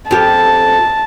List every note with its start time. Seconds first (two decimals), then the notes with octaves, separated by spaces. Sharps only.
0.11 F2 G4 A5